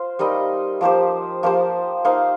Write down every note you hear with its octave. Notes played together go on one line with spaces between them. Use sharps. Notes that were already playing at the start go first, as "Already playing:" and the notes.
Already playing: F4 C5
G3 D#4 A#4 D#5
F3 A#3 G4 C5
F3 A#3 G4 C5
A#3 D#4 C5 F5